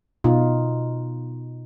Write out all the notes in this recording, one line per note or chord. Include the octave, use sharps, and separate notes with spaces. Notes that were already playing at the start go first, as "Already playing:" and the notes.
B2 D#4 F4